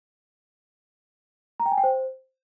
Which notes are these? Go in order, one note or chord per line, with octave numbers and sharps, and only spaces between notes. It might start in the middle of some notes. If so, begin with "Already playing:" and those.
A#5
G5
G#5
G5
C5